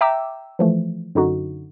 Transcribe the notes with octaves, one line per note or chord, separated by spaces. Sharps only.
E5 G5 A#5 D6 E6
E3 F3 A3
F#2 D3 D#4 F#4